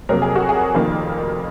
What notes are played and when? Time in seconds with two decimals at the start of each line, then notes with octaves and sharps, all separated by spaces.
0.09 F2 C3 F#3 A#3 A#4
0.22 G#4
0.35 F#4
0.49 G#4
0.75 F1 F2 D#3 A#3